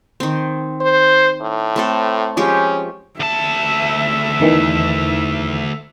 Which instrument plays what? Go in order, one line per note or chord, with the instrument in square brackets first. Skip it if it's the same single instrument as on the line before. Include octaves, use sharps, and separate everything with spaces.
[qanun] D#3 C4
[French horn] C5
A2
[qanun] A3 C4 A4
[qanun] F3 G#3 G4 [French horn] C#4
[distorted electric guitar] D2 A5 [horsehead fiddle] E5
[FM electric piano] E2 D#3 E3